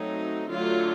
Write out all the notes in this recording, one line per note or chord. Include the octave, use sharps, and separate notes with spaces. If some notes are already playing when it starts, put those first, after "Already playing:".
Already playing: F#3 A3 C4 D#4
D3 F#3 A3 F4